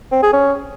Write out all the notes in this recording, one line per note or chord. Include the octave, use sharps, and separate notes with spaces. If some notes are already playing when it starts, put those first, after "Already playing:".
C4
G#4
C#4